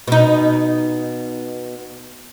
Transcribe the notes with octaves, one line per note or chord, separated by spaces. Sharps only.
B2 D#4